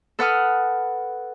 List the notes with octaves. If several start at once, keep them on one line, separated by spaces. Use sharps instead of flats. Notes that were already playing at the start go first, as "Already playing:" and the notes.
A4 B4 F#5 D#6 F6